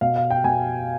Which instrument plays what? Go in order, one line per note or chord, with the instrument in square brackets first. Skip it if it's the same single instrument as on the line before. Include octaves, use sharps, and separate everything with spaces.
[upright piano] B2 F5
F5
G5
B2 G#5